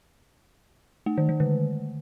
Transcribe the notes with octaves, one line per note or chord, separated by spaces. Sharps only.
A3
D#3
D#3
D3